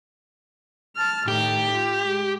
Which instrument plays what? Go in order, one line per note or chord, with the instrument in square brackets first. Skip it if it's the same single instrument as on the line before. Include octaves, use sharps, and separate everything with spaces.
[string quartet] A5 F6
[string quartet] A2 D#3 [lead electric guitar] G4
[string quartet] F4
G#3